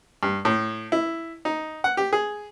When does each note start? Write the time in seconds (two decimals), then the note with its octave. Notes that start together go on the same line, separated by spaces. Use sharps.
0.23 G2
0.45 A2
0.92 E4
1.45 D#4
1.84 F#5
1.97 G4
2.13 G#4